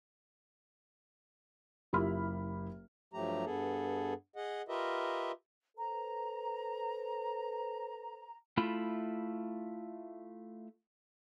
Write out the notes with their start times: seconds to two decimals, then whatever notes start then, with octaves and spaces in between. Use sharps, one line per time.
1.93 F#1 E4 F4 G4 B5 F6
3.14 G2 F3 F#3 A3 G4 A#5
3.45 G2 B3 G#4 A4
4.36 G#4 D#5 F#5
4.68 F4 G4 A#4 B4 D#5 E5
5.77 A4 B4 C5 A#5
8.57 A3 E4 F4 E5 B5